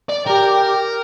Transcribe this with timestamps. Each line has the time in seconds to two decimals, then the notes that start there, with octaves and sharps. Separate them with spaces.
0.09 D5
0.26 G4 A#4